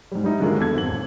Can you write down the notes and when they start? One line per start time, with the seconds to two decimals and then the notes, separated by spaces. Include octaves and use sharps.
0.12 G#2 G3
0.24 G3 D#4 E4
0.40 D3 D#3 F#3 G#3 A#3 F4
0.59 E2 A4 G#6
0.74 G#1 F#7
0.88 D1